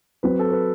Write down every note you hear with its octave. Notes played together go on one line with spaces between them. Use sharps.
F#3 C4 F#4 B4
A4
B4